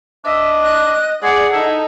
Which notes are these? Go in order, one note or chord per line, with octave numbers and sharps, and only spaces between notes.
D4 D#5 E5
F#6
G#4 D5 F#5
D#4 E4 A4